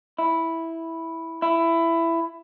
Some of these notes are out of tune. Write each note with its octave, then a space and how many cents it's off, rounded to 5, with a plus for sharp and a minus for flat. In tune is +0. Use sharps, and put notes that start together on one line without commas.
E4 -5
E4 +15